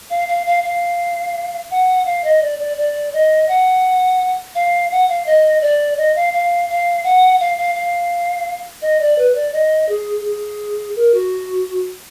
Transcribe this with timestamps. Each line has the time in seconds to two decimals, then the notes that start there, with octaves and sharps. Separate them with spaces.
0.10 F5
0.28 F5
0.46 F5
0.64 F5
1.71 F#5
2.06 F5
2.24 D#5
2.42 D5
2.59 D5
2.77 D5
3.14 D#5
3.48 F#5
4.55 F5
4.91 F#5
5.09 F5
5.26 D#5
5.62 D5
5.98 D#5
6.16 F5
6.33 F5
6.69 F5
7.04 F#5
7.40 F5
7.58 F5
7.75 F5
8.82 D#5
9.01 D5
9.18 B4
9.35 D5
9.53 D#5
9.89 G#4
10.25 G#4
10.96 A#4
11.14 F#4